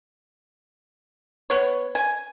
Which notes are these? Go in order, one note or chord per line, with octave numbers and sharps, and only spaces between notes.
B3 C#5
G#5